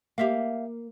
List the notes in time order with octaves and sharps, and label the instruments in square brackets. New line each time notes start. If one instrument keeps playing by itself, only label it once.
[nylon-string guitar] A#3 [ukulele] G4 E5 F5